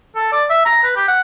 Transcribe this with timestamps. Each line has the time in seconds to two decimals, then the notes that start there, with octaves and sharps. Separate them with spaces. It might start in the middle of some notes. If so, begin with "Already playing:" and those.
0.16 A4
0.32 D5
0.50 E5
0.65 A#5
0.84 B4
0.96 G4
1.08 F#5